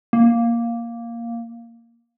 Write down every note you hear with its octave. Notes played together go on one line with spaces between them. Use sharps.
A#3